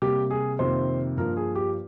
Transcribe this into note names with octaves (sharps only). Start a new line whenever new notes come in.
C3 G3 A#3 G4
G#4
F2 C3 D#3 A#3 C5
G2 F3 A#3 A#4
G#4
G4